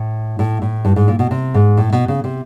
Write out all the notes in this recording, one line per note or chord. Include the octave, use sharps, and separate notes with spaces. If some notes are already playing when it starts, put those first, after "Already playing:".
Already playing: A2
A2
A2
G2
G#2
A#2
B2
C3
G#2
A2
B2
C#3
C3